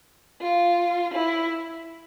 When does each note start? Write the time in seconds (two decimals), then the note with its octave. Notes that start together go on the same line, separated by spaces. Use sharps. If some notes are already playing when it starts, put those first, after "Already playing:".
0.41 F4
1.14 E4